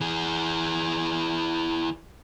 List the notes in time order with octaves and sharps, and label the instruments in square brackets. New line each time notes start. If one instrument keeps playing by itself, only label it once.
[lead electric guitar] E3 G#4